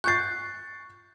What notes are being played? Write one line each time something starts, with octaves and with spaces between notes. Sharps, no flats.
C#6 F#6 G6 A6 C7